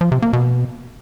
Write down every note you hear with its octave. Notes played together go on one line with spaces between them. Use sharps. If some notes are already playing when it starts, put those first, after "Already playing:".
F3
C3
A#3
B2